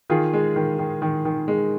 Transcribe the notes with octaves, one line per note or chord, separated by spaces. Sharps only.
D#3 F4 G#4
G#3
D#3
D#3
D#3
D#3
G#3